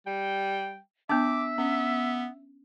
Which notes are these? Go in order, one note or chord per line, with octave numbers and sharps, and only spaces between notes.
G3 G5
B3 D4 E5 D6
B3 C#4